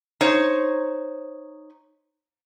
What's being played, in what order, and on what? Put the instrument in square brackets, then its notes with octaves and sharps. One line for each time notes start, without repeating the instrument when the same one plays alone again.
[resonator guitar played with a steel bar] D#4 C5 C#5